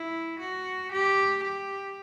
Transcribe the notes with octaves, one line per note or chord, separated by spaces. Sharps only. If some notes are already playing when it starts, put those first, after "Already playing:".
Already playing: E4
F#4
G4
G4